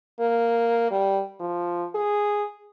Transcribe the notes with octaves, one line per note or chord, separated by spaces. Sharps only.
A#3
G3
F3
G#4